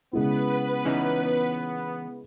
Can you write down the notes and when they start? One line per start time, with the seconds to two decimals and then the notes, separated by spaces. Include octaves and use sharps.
0.13 C#3 G#3 B3 E4 B4
0.85 E3 C#4 D#4